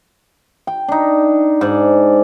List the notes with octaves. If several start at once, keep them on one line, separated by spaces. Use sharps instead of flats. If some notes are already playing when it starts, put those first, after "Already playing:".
G5
D4 D#4
G#2 D5